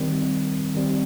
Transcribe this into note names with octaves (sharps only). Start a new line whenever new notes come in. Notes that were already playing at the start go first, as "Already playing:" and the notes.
Already playing: D#3 G3 C4
D#3 G3 C4